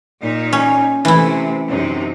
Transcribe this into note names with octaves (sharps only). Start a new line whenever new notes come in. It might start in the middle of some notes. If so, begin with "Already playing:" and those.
A#2 D#4
C#4
C3 E3 A3 E4
F#2 C3 D#4